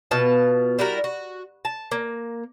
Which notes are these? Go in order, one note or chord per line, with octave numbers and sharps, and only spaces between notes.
B2 B3 F4 A5
G3 E4 F#4 A#4
F#4
A5
A#3